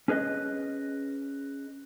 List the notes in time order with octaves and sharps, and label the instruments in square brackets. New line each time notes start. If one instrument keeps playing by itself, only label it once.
[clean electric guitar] C#4 G#4 B4 D#5